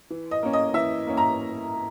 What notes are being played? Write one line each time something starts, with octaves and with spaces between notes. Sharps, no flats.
E3
D#5
A#3 C#4
D#5
E3 E5
A#3 C#4
A#5